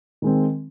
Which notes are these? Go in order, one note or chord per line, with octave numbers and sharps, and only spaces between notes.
D#3 G#3 C4